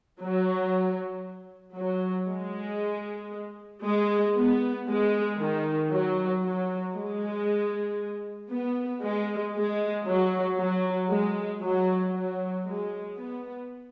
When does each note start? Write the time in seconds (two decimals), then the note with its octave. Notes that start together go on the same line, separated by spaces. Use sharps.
0.21 F#3
1.76 F#3
2.28 G#3
3.85 G#3
4.35 B3
4.88 G#3
5.40 D#3
5.91 F#3
6.43 F#3
6.95 G#3
8.50 B3
9.03 G#3
9.55 G#3
10.07 F#3
10.58 F#3
11.10 G#3
11.62 F#3
12.14 F#3
12.66 G#3
13.17 B3